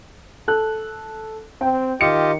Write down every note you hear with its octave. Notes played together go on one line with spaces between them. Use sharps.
A4 F#6
C4 G5
D#3 F4 G4 D#5 C#7